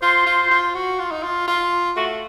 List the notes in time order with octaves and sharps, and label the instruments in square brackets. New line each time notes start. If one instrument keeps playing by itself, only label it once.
[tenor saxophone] F4 [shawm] C5
[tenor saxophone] F4
F4
F#4
F4
D#4
F4
F4
[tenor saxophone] A3 [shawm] F#4